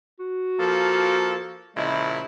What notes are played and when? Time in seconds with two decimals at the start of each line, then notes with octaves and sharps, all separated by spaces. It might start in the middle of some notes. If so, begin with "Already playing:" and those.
0.19 F#4
0.59 F3 A#3 A4
1.77 A#1 C#3 G#3 E4